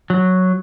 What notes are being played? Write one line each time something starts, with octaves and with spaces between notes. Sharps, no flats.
F#3